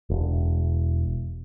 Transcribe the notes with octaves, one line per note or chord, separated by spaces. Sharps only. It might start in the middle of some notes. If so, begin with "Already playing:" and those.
E1